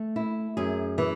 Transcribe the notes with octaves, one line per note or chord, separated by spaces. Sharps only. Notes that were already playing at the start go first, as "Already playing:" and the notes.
Already playing: A3
E4
F#2 G#4
E3